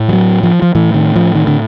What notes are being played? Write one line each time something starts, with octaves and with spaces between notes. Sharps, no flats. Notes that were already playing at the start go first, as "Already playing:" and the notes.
Already playing: A2
F3
F#3
F3
F3
A2 E3
D#3
F3
D#3
D3